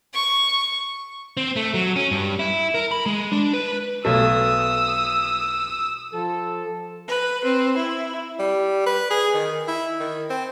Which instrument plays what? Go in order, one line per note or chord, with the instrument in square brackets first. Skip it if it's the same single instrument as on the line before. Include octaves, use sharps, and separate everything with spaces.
[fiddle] C#6
[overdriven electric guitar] C4
A3
F#3
C#4
G2
E4
A#4
B5
G#3
D4
B4
[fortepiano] B1 A3 [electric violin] D#6 E6
[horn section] F3 A4
[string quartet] B4
C4
E4
[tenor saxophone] G3
B4
G#4
D#3
E4
D#3
C4